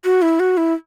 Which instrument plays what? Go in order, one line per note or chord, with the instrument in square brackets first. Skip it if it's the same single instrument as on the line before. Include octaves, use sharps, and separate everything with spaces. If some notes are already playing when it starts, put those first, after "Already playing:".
[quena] F#4
E4
F#4
E4